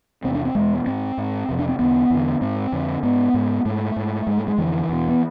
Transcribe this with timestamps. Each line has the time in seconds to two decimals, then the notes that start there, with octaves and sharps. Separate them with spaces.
0.24 E2 C3 C4
0.35 D4
0.45 C4
0.55 E2 B2 G#3
0.86 G#2 C4
1.17 G#2
1.49 F2 C3
1.59 D4
1.69 C4
1.79 E2 D3 B3
2.10 E2 D3
2.41 G#2 C4
2.72 F2 D3
3.03 G#2 B3
3.34 G#2
3.65 G#2 A3
3.96 G#2
4.27 G#2 G#3
4.37 A3
4.48 G#3
4.58 F2 D3 E3
4.89 E2 B2
5.08 B3